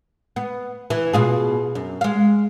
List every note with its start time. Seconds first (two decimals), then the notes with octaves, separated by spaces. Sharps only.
0.36 B3
0.90 E3
1.13 B2 F4 G#4
1.75 F#2
2.01 G#3 F5